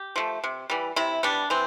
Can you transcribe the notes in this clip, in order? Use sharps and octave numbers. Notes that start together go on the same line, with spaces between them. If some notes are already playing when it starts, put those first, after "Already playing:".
Already playing: G4
F3 A3
C3
E3 G3
C3 E4
G3 B3 D4
E3 C4